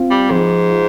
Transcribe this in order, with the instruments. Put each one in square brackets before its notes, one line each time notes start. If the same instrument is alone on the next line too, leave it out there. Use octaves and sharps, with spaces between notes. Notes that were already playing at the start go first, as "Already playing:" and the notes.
Already playing: [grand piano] C4 F4
[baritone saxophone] G3
[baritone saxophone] G#2 [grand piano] F3
[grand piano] F4